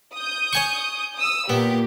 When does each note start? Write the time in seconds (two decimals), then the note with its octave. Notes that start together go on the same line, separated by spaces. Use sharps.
0.15 D#6 G6
0.53 C#5 G#5 C#6
1.17 D#6 E6
1.49 A#2 B3 G4